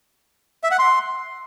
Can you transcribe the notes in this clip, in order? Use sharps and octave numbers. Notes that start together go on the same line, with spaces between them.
E5
F#5
C6